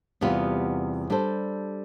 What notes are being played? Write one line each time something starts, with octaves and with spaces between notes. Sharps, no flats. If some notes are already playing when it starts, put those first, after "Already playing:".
E2 C3 G3 B3 F4
G3 D4 A4 C5